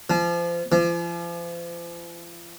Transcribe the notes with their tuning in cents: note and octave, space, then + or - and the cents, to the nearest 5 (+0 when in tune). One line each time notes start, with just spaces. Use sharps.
F3 -30
F3 -40